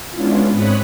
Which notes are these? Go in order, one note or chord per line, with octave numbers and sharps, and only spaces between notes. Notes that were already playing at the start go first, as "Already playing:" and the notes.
G#3 B3 C#4 D4 E4 F4
G#2 C4 C#5 B5 D#6 F#6